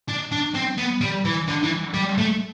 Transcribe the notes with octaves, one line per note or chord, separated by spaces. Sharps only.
D4
D4
C4
B3
G3
E3
D3
E3
G3
A3